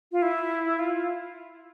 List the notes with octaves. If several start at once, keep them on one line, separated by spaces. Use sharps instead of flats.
F4
E4
F4
F4